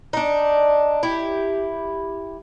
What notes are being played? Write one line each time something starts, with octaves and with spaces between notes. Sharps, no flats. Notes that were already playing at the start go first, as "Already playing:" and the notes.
D4 D#4
E4 G4